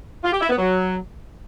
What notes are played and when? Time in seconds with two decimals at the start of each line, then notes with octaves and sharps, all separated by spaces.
0.24 F4
0.33 G4
0.41 E4
0.50 B3
0.58 F#3